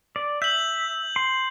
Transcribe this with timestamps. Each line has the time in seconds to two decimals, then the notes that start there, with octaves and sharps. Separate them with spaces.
0.16 D5
0.42 E5 G6 F#7
1.16 C6